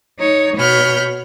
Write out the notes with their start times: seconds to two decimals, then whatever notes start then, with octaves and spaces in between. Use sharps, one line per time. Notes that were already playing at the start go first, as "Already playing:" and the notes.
0.20 D#4 C#5
0.56 B2 C#5 B5 F6 G6